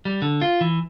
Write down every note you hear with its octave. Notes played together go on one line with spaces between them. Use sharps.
G3
D3
F4
E3